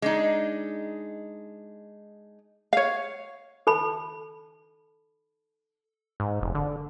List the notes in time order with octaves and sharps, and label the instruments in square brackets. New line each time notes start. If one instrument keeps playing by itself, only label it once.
[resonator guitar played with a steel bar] G#3 D4 D#4
[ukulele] C#5 F5
[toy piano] A4 A5 B5
[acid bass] G#2
F1
D3